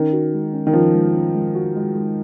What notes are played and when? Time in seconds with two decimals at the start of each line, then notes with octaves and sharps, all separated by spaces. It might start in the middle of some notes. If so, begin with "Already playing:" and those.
Already playing: D#3 C#4
0.13 F#4
0.34 G#3
0.53 C#4
0.67 D#3
0.73 F3 C#4
0.94 G#3
1.14 C#4
1.35 G#3
1.55 F#4
1.76 G#3
1.95 G#3